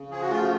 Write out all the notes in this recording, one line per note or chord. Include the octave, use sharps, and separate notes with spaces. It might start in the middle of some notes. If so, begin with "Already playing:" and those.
Already playing: C#3
F3 G#4
F#4
A3 F4